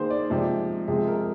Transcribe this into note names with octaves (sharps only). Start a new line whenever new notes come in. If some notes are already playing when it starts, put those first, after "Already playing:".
Already playing: D#3 A#3 G#4 C5
D5
C3 F3 G#3
C3 F3 G#3 G#4
A#4